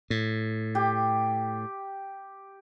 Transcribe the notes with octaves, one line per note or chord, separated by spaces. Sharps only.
A2
G4